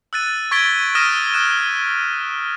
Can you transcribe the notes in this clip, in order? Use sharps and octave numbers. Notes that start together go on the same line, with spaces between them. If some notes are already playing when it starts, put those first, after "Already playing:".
E6 F#6 A6 D#7
C#6 G#6 A6 B6 D7 G7
D#6 F6 F#6 A#6 D#7 E7
D#6 F#6 E7